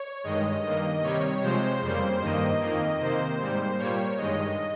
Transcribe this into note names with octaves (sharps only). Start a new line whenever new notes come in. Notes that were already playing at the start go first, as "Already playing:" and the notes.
Already playing: C#5
G2 D#3 G#3 D#5
G2 D#3 A#3 D#5
C3 D#3 G3 C#5
C3 F3 G#3 C5
F2 C#3 G3 A#3
G2 D#3 A#3 D#5
F2 D#3 A#3
C3 D#3 A#3 C5
G#2 G3 A#3
A#2 G3 A#3 C#5
G2 D#3 G#3 D#5